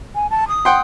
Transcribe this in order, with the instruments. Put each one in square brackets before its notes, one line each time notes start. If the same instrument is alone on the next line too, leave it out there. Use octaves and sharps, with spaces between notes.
[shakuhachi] G#5
A5
D#6
[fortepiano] F#5 G5 C6